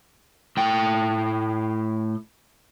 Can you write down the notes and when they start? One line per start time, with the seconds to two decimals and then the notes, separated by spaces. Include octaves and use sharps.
0.57 A2 G5